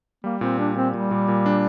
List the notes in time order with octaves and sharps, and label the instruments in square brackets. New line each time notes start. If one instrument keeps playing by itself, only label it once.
[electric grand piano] G3 [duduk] A#3
[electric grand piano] A#2 [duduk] C4
[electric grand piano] G3 [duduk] D4
[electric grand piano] A#2 [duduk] C4
[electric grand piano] A#2 [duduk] G3
[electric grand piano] A#2
A#2
D4